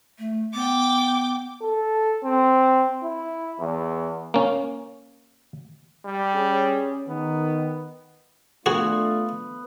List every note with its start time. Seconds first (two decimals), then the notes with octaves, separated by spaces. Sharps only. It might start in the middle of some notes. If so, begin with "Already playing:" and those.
0.18 A3
0.54 B3 G5 D6
1.62 A4
2.24 C4
3.03 E4
3.60 E2
4.34 A#3 C#4
6.05 G3
6.35 C#4 G#4
7.08 D#3 B3
8.66 A3 B3 D4 F4 F#4 G#4